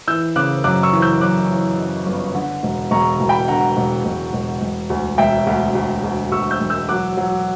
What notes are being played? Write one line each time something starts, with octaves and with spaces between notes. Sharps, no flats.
E3 E6 G6
C#3 D6 F#6
F#2 D6 F#6
C#6 E6
E3
E6 G6
F#2 D6 F#6
E3
F#2
G1
D3
E1
E1 A#5 C#6
E1
G5 B5
D3 F#5 A#5
E1
E1
E1
E1
D2
E1 E5 G5
D2
D2
D2
D2 C#6 E6
E6 G6
E1
E6 G6
F#3 D6 F#6
F#3